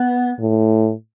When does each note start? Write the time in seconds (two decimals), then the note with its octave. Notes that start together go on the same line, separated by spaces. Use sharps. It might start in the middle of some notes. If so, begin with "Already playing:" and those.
Already playing: B3
0.39 A2